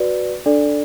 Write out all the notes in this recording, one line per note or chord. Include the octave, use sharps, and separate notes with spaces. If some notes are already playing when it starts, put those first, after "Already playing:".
Already playing: F#4 B4 D5
D4 A4 D5